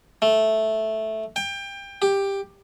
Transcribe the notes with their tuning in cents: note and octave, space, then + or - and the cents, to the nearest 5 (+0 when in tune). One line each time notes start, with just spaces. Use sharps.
A3 -5
G5 +25
G4 +10